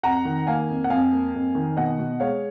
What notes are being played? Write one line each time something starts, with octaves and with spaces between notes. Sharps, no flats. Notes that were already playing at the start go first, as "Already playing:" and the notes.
F2 F#5 A#5
D#3
A#3 F5 G#5
F2
F#5
F2 F5 G#5
A#3
F2
D#3
B2 D#5 F#5
B2
G#3 C#5 F5